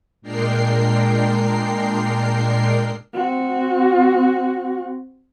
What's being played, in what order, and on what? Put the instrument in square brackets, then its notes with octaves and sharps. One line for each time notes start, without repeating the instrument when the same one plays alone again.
[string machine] A#2 G#3 D4 A#4 G5 C7
[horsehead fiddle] C4 F#4